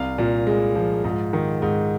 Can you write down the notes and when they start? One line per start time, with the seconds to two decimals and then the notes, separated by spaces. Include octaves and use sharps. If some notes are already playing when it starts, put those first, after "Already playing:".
Already playing: C2 F5
0.18 A#2
0.47 G#3
0.75 F3
1.04 G#2
1.33 D#3
1.62 G#2